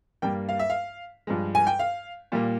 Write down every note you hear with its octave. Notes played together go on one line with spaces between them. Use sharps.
G2 G3 A#3 G5
F5
E5
F5
G2 F3 G#3
G#5
G5
F5
A#2 G3 A#3